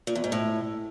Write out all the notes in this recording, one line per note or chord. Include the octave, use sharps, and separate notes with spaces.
A#2
E2
G#2
A2